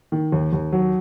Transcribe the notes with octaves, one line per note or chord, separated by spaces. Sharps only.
D#3
D#2
D#2
F#3